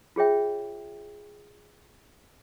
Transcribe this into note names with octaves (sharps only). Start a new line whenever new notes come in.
F4 G#4 C#5 E5 G5